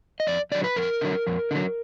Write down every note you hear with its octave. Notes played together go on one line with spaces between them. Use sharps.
D#5
F2 D5
D3 F#3 D5
B4
F2 A#4
D3 F#3
F2
D3 F#3